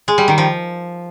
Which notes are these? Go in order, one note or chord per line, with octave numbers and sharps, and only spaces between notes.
G#3
G3
D#3
F3